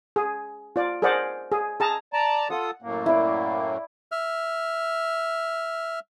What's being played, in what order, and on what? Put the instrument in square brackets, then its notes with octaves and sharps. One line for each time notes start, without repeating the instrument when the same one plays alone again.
[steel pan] G#4
F4 D5
G#4 A#4 C5 D5 F#5
G#4
G#4 A5 A#5
[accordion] D5 A5 A#5
[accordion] F4 A4 D#6 [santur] F#5
[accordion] F#2 A2 A#3
[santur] E4 D5
[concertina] E5 F6